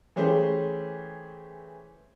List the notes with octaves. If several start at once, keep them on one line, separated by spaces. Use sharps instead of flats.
E3 A3 C#4 G4 G#4 C5